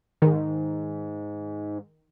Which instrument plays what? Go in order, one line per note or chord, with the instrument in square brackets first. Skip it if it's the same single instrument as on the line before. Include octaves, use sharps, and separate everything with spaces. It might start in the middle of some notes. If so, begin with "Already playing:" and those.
[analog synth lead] G#2 [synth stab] D#3